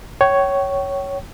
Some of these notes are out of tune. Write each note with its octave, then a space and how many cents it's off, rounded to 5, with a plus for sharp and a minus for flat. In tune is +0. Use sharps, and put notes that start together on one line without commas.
C#5 +0 G5 -35